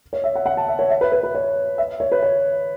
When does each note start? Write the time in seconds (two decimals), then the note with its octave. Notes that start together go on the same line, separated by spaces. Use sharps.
0.13 C#5
0.24 E5
0.35 F#5
0.46 F#5
0.57 A5
0.68 E5
0.79 C#5
0.90 E5
1.01 B4
1.12 B4
1.23 B4
1.35 C#5
1.78 E5
2.00 C#5
2.12 B4
2.23 C#5